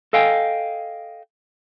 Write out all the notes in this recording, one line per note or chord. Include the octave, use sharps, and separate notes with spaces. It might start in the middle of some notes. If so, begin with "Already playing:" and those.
A4 D#5 F5 G5 G#5